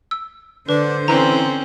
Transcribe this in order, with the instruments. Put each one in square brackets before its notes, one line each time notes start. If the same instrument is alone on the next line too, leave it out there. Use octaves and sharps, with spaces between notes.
[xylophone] E6
[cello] D3 C5 [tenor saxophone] D4 [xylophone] B4
[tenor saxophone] E3 [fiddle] C4 C#4 [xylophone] A#5